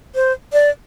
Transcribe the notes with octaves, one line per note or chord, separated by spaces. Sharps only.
C5
D5